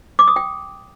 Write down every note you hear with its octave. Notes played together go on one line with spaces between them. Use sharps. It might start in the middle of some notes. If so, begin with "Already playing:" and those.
D6
D#6
G5